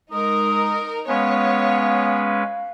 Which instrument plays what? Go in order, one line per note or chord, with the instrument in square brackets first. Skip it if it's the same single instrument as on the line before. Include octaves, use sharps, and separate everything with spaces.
[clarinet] G#3 [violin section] D#4 A#4 [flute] D#6
[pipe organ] G#3 C#4 B4 [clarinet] B3 [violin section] C#5 [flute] F5